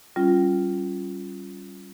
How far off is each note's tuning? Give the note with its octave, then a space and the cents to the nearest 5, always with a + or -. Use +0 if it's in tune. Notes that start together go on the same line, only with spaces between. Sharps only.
G3 -20 C#4 +0 F4 +0